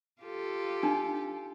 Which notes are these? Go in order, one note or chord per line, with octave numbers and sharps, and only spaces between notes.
F4 G4 A4
D4 D#4